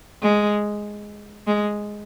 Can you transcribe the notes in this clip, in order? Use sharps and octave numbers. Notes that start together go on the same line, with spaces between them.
G#3
G#3